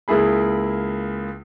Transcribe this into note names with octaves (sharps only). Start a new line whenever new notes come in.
C#2 A#3 E4 G#4 B5